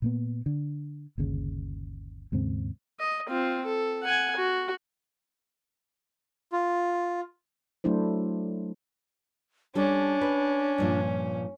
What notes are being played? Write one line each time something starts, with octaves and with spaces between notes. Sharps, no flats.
A#2 A#3 B3
D3
G1 D#2 C#3
D#2 G#2 C#3 C4
D#5
C4 F4
A4
F#5 G#5
F#4
F4
F#3 A3 D4 E4 C5
G3 C#4 D4 A4
B4
G2 A#2 F3